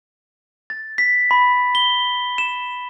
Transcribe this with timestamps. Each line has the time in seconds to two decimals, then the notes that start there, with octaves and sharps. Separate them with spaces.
0.70 A6
0.98 B6
1.31 B5
1.75 G7
2.38 E7